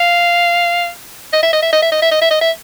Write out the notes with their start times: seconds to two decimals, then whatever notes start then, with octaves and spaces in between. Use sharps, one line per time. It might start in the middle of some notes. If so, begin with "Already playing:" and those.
Already playing: F5
1.33 D#5
1.43 E5
1.53 D#5
1.62 E5
1.73 D#5
1.83 E5
1.92 D#5
2.02 E5
2.11 D#5
2.22 E5
2.31 D#5
2.41 E5